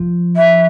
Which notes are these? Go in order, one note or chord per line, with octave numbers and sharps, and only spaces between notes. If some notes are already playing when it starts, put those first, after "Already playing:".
Already playing: F3
E5